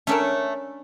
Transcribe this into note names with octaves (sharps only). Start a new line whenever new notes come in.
A3 C#4 D4 A4 A#4